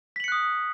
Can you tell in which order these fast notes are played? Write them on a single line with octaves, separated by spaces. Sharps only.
B6 F#7 C#7 F#6 D#6